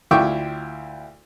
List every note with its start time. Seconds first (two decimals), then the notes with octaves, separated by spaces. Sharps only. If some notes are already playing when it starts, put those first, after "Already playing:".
0.11 D2 E4 F4 G5 C#6 D6